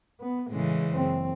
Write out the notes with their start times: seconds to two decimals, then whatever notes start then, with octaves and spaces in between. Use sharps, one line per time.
0.21 B3
0.51 A2 C#3 E3 G#3
0.89 F#1 C4